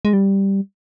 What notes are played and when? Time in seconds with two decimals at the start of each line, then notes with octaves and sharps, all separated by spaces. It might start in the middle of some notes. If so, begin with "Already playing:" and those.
0.05 G#3
0.13 G3